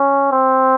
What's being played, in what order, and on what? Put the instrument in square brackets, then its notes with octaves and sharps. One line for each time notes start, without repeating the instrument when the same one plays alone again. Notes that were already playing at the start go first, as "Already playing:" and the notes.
Already playing: [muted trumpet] C#4
C4